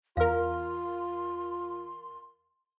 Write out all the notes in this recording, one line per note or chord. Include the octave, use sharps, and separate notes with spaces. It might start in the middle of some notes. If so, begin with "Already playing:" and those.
E2 F4 A#4 F5 C6 F6